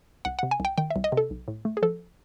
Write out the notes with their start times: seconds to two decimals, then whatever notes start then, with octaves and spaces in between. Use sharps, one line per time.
0.25 C2 F#5
0.39 C3 F#5
0.51 G#5
0.60 C2 G5
0.78 D#3 G5
0.90 E5
0.96 C2
1.04 D#5
1.12 C3
1.17 A4
1.30 B1
1.48 A2
1.65 A3
1.77 G#4
1.82 F3 A4